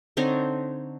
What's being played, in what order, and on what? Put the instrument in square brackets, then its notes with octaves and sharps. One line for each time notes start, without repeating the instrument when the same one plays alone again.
[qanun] D3 C4 D#4 C#5